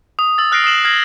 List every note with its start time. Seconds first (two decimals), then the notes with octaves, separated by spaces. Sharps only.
0.19 D#6
0.38 E6 A6
0.52 F6 F#6 A#6 C7 D7
0.64 D#6 C7 E7 F#7
0.85 F6 G#6 A#6 C7 F#7